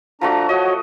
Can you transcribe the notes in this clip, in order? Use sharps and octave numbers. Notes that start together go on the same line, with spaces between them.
F3 A3 D4 F#4 A#5
F#4 C#5 D#5